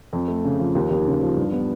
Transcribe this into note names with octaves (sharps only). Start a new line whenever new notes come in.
F2
A3
C#3
F3
D#2
D#2
C#3
F3
G2
B3